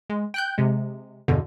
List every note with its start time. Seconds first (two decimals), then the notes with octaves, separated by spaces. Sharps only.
0.10 G#3
0.34 G5 F#6 G6
0.58 C3 G#3
1.28 E2 G2 B2 D3